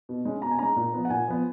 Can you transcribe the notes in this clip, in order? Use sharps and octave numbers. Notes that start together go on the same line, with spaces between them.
B2
G#3 C#4
B2 A#5
G#5
G#3 C#4 A#5
A#2
F3 B3
F#5
A#2 G#5
F3 B3